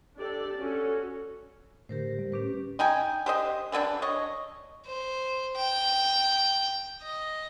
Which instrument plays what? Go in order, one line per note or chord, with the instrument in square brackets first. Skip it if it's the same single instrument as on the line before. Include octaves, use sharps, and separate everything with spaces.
[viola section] D4 G4 A4 D5
C#4 F#4 A4
[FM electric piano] A2 D3 [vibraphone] G4 A#4 C5
[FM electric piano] G3
[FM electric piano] A2 D6 [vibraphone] C#4 G4 B4
[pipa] D#4 D#5 G5 G#5
G4 C5 D#5
E3 G3 B3 D4
C#5 D#5
[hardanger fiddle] C5
G5
D#5